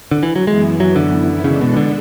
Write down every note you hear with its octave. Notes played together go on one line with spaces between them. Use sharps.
D3
E3
F#3
F#2 E3 G#3 B3 E4
F#3
D3
C#3 G#3 B3 D4 A4
B2
D3